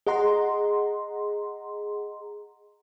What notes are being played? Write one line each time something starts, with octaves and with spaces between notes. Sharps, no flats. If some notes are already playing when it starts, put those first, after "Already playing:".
G#4 D#5 F#5 A#5 C6